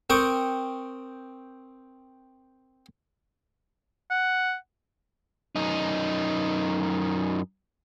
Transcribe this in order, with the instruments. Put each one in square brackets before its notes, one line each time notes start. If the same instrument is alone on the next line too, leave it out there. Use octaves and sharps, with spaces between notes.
[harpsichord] C4 A#4 G5 C#6 D#6
[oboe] F#5
[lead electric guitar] F#2 D#4